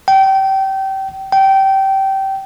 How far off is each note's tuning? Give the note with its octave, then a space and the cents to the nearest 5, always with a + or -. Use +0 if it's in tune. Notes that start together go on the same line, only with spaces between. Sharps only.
G5 -25
G5 -20